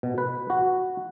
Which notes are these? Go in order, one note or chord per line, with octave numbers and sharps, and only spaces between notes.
B2
B4
F#4